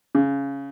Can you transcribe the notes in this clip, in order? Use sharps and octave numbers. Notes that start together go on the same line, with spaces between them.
C#3